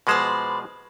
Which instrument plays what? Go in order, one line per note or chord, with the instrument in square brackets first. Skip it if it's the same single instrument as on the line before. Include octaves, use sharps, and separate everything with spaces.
[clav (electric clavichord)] B2 F3 G#3 [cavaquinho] B4 C5 D5